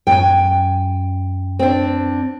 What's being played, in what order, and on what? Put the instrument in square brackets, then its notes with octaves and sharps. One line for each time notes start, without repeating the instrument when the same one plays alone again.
[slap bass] F#2 F#3 [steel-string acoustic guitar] G5 G#5
[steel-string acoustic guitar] C4 D4